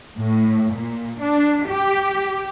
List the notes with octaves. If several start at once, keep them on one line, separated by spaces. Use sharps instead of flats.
A2
A#2
D4
G4